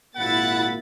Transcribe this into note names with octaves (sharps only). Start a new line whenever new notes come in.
G#1 A#2 A#3 E4 F#5 B5 A6